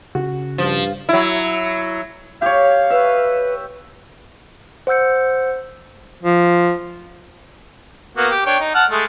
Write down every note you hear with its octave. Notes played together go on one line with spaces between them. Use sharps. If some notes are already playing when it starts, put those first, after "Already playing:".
C#3 F#4
G2 F3
F#3 E4
G4 C#5 F5
B4 E5
C5 F#5 E6 G6 C#7
F3
A#3 B3 F#4
G4
D4 C#5 G5
D#4
F#5 A5 F6
G#3 A3